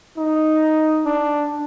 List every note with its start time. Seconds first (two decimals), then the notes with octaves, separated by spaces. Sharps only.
0.17 D#4
1.06 D4